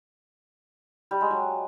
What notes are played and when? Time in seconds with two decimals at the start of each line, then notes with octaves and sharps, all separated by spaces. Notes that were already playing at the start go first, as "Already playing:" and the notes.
1.11 G3
1.21 G#3
1.31 F#3